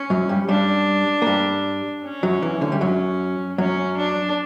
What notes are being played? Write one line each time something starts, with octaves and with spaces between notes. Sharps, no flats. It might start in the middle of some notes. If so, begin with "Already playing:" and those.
Already playing: C#4
F#2 F#3
G2 G3
G2 G3 D4
A#3
G2 G3
C#4
F#2 F#3
E2 E3
D2 D3
G3
F#2 F#3 C#4
F#2 F#3 C#4
D4